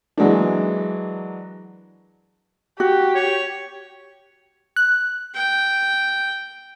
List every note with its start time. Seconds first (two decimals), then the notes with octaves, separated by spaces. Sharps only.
0.17 E3 F#3 G#3 A#3 D4
2.80 F#4 G4
3.15 C#5
4.76 F#6
5.34 G5